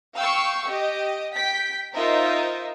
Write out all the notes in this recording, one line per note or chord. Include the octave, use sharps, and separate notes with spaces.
F5 G5 C#6 E6
G4 D#5
G5 B6
D#4 F4 A#4 C5 D#5 E5